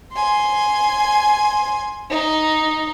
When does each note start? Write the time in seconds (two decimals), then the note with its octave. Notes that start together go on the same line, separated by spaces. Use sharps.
0.13 G#5 C6
2.10 D#4